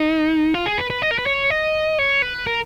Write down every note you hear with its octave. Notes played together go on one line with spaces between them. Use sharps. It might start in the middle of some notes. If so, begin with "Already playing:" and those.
Already playing: D#4
F4
G#4
B4
B4
D#5
A#4
B4
C#5
D#5
C#5
B4
A#4